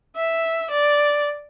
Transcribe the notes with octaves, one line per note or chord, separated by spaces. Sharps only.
E5
D5